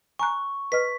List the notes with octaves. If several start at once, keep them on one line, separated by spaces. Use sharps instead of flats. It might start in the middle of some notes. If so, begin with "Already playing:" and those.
G#5 A#5 C#6 F#6
B4 D#5 F6 B6